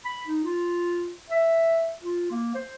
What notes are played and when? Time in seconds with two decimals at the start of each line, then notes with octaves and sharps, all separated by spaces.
0.05 B5
0.27 D#4
0.44 F4
1.30 E5
2.02 F4
2.31 A#3
2.55 C5